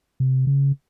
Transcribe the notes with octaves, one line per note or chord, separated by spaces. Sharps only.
C3
C#3